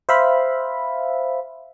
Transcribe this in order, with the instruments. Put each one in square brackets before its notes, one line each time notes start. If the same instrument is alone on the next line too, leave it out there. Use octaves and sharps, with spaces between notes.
[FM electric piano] C5 E5 F5 B5